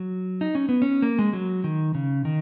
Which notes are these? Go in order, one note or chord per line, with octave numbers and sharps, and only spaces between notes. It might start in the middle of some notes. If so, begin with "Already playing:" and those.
Already playing: F#3
D#4
C#4
B3
C#4
A#3
G#3
F#3
D#3
C#3
D#3